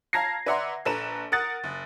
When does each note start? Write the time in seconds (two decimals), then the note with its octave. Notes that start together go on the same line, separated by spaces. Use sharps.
0.13 F5 A5 A#5 G#6 A#6 C7
0.46 B4 D5 E5 F#5 A#5 C6
0.85 A#1 A4 B4 A#5 E7
1.32 A#4 F#5 D#6 F#6 A6
1.64 F#1